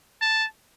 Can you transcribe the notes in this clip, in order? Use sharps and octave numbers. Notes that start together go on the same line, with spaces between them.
A5